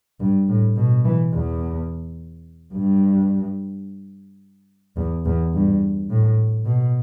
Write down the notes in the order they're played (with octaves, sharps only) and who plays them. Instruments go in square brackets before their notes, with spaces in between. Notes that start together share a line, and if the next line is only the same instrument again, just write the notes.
[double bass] G2
A2
B2
E3
E2
G2
E2
E2
G2
A2
B2